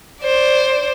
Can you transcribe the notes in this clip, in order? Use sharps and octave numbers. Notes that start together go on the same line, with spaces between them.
C5 D5